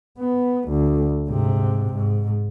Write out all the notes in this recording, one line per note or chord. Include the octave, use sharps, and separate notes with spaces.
B3
D2
G#2 C3
G#2